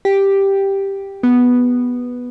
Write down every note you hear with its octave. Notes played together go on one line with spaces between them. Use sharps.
G4
B3